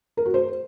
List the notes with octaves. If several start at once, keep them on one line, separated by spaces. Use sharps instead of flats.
A#4
F#4
C5